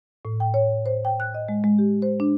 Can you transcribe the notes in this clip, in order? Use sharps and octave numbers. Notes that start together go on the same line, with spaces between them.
A2
G5
C#5
C5
G5
F#6
D#5
G#3
G#3
G4
C5
D4